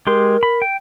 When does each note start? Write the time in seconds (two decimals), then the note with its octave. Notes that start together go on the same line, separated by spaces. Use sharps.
0.07 G#3 G4 A#4 C6
0.43 B5
0.62 G5